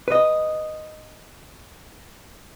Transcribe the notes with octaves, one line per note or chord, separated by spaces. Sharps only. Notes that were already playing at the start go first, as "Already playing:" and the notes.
B4 D#5